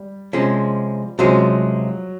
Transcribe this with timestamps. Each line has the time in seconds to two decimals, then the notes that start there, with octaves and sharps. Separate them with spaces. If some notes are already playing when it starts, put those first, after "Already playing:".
Already playing: G3
0.33 C3 F3 G#3 C#4
1.19 C3 F3 F#3 G#3 C#4